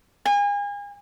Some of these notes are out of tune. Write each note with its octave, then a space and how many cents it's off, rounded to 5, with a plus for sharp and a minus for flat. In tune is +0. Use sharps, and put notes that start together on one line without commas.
G#5 -35